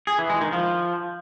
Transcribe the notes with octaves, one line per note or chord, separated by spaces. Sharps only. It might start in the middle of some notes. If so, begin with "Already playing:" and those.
G#4
E3
G#3
D#3
F3